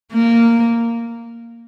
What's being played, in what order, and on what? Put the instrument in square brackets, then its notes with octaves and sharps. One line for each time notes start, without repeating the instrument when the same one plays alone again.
[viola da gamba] A#3